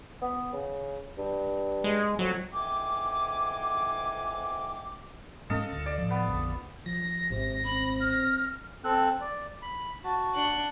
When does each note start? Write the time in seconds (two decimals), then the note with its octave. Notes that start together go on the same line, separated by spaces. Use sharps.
0.22 B3
0.53 C#3
1.18 G2
1.84 G#3
2.19 F2 F#3
2.53 F2 G#2 E3 G5 G#5 D6
5.50 G#2 G#3 C#4 A4 D#5 F5
5.72 D2
5.86 D5
5.98 A2 F3
6.10 B3
6.28 A#1 F2 D3
6.86 F3 A#6
7.30 G#1 G#2 C3
7.64 C4 B5
8.00 F6
8.84 C4 A4 F#6
9.21 D5
9.62 B5
10.04 F#4 A5
10.34 D4 F#5